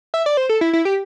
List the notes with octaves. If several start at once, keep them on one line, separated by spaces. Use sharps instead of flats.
E5
D5
C5
A4
E4
E4
G4